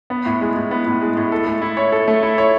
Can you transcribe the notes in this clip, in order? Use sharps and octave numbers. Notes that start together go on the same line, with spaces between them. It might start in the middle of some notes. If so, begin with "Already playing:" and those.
B3
A2
G#3
A2
B3
A2
G#3
A2
A4
A3
E4
C#5
A4
A3
E4
C#5